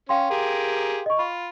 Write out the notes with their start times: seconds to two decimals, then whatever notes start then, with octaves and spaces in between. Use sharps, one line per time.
0.09 C#4 F5 G5 C6
0.31 G4 G#4 A#4
1.06 D#5 C#6
1.19 F4 B5